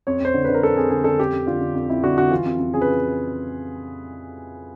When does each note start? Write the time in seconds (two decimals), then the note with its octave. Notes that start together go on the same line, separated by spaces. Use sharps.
0.07 F2 C#5
0.20 F2 C5
0.34 D3
0.45 D3 B4
0.54 A#4
0.62 F2 A4
0.77 F2 G#4
0.90 D3 G#4
1.04 D3 A4
1.19 F2 G4
1.33 F2
1.47 D3 F4
1.60 D3
1.74 F2
1.90 F2 E4
2.03 D3 F#4
2.18 D3 F#4
2.31 E3 F4
2.45 F2
2.59 F2
2.74 C#3 G#4
2.81 B4